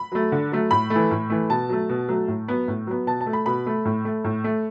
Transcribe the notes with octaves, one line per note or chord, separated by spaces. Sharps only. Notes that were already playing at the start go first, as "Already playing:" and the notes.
Already playing: B5
F#3 A3
D3
F#3 A3
A2 B5
A3
E3
A2
E3 A3
B2 A5
F#3 A3
B2
F#3 A3
A2
F#3 B3
A2
F#3 B3
B2 A5
A5
A3
B5
B2 B5
A3
A2
A3
A2
A3